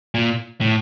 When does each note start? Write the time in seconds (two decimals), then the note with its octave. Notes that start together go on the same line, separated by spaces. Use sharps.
0.14 A#2
0.61 A2